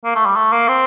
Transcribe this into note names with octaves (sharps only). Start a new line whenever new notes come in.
A#3
A3
G3
A3
A#3
C4